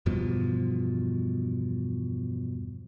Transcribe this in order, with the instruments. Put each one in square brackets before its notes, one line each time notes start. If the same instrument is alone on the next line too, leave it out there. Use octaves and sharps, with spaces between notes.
[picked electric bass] E2 G2 B2 F3